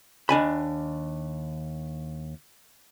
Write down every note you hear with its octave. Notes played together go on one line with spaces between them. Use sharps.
D#2 D4 G#5 B5